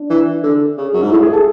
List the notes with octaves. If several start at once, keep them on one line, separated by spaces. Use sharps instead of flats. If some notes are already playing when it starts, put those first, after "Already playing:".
Already playing: D4
E3
D3
C#3
F#2
G#2
A2 E4
G#4
A4